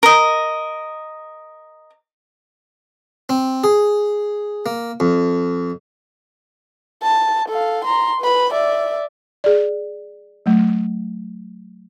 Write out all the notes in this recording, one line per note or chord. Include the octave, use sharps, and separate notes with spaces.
A#4 D#5
C4
G#4
A#3
F2
A5
A4 F5
A#5 C6
B4 B5
D5 E5
G#4 D5
F#3 A3